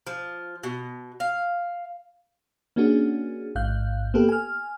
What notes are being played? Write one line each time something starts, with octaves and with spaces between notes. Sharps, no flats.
F3
B2
F5
A#3 C#4 D4 F#4 G#4
A1 G#2 F5 F#6 G6
A#3 B3 G4 A4 B4
G#5 F6